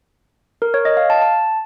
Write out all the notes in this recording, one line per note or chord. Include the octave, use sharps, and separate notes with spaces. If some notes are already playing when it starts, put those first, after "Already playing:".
A#4
C#5
D#5
F5
A5
A5